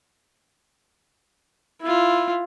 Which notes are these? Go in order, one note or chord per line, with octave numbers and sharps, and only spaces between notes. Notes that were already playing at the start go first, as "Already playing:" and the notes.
E4 F4